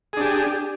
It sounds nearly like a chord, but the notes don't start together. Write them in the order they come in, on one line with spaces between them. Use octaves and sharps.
G#4 D4 G4